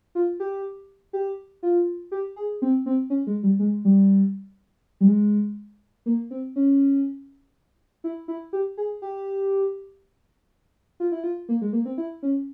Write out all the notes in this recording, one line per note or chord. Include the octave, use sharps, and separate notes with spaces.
F4
G4
G4
F4
G4
G#4
C4
C4
C#4
G#3
G3
G#3
G3
G3
G#3
A#3
C4
C#4
E4
E4
G4
G#4
G4
F4
E4
F4
A#3
G#3
A#3
C4
E4
C#4